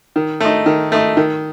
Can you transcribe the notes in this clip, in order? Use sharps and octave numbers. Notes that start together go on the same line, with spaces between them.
D#3
A3 D#4
D#3
A3 D#4
D#3